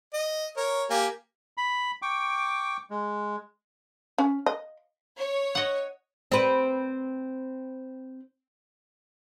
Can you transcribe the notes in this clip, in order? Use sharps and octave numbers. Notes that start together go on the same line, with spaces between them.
D#5
A#4 C#5
A#3 G4 G#5
B5
G5 C#6 D6
G#3
C#4
D#5
C#5
D#5 F#5
C4 B4